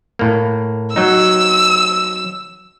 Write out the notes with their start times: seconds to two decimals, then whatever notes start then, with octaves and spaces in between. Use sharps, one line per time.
0.19 A2 A#3
0.96 F#3 D#4 E6